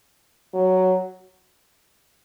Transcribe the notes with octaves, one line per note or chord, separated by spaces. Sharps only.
F#3